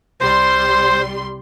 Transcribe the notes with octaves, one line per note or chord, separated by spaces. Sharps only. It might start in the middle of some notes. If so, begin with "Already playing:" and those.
C2 G3 C5 C6